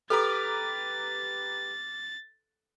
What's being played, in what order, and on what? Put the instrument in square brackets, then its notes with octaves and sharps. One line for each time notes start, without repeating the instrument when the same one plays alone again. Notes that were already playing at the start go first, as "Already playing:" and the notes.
[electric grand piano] G4 B4 A#5 [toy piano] A4 [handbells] D6 F6 [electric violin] A6